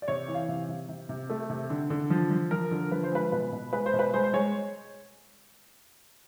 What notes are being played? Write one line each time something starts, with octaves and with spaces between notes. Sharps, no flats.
D5
C3 C#5
E3
F5
C3
C3
C3
C3
A3
C3
D3
D3
F3
F3
F3 A#4
D3
F3 B4
C5
G#3 B4
B2 B4
B2
G#3 B4
C5
B2
B4
G#3 C5
C5
G#3 C#5